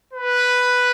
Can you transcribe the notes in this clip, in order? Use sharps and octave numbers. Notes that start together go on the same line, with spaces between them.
B4